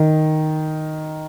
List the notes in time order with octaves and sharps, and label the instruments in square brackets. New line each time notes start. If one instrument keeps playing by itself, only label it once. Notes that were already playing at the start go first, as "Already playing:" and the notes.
Already playing: [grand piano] D#3